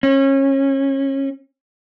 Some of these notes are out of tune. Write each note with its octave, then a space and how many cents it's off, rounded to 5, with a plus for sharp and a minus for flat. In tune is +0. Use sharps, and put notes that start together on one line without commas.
C#4 -25